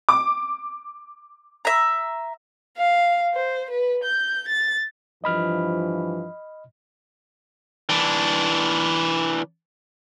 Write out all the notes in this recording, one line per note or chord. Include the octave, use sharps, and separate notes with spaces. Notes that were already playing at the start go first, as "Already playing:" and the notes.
D6
E5 A#5
F5
C5
B4
G6
A6
G2 E3 F3 D#5 B5 F6
E3 D4